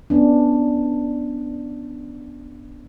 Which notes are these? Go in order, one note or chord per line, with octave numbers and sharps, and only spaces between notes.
B3 C#4 D4